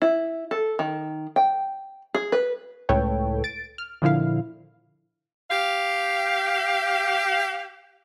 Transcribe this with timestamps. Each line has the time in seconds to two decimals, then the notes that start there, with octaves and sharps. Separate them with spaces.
0.02 E4
0.51 A4
0.79 D#3
1.36 G5
2.14 G#4
2.32 B4
2.89 C#2 A2 A4 B4 C#5 G5
3.44 A6 D7
3.78 F6
4.02 A#2 D3 F3 E4 F5
5.51 G4 F5